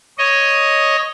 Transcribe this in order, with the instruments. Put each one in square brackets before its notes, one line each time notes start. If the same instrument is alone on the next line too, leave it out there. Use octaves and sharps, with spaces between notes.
[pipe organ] C#5 D#5